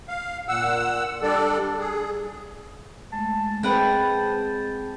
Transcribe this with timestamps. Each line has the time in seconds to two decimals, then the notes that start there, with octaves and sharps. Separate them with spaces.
0.08 F5
0.48 A#2 F#5 E6
1.22 G3 D4 A4 D5
1.79 G#4
3.13 G#3 A3 A5
3.63 G#3 C4 G#4 B4 F#5 G5 B5